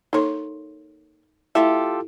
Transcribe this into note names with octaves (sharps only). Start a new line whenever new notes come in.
A#3 D#4 A4 C#5 C6
A3 E4 F4 G4 A4 E5